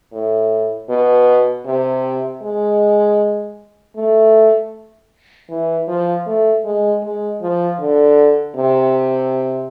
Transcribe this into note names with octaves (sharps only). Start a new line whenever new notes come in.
A2
B2
C3
G#3
A3
E3
F3
A3
G#3
G#3
F3
D3
C3